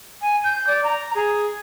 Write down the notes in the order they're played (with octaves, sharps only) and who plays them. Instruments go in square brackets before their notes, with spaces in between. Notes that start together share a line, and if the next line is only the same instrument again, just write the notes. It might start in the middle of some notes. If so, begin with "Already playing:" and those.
[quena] G#5
G6
D5
A#5
G#4